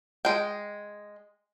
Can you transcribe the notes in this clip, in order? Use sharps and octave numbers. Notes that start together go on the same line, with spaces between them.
G#3 G5